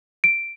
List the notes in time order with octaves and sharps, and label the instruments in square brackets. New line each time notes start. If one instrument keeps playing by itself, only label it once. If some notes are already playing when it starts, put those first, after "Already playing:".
[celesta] D7